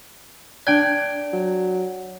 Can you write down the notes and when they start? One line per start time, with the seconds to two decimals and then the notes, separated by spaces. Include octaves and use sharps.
0.67 D4 D5 G5 G#6
1.33 F#3